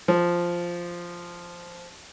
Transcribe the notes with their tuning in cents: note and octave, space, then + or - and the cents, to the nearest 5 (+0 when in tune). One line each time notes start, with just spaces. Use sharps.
F3 -5